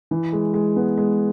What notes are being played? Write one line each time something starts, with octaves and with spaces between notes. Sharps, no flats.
E3
G#3
G#3
B3
G#3